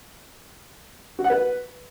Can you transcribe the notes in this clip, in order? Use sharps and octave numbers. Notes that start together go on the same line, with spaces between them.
F#4
F#5
B4